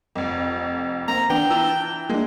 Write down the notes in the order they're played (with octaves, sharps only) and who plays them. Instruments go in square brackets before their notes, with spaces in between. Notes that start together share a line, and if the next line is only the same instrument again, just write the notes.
[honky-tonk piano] F1 F2
[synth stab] A#3 C4 [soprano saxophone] A#5
[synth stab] E3 B3 D4 [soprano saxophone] G5
[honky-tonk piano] E3 [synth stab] A5 A#5 E6
[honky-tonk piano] G#3 [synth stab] A#3 D4